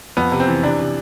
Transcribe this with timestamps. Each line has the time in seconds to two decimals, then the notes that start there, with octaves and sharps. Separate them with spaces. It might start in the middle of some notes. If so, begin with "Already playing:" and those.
0.17 F2 B3
0.32 C3
0.40 C4
0.47 E3
0.63 C3 D4
0.79 C3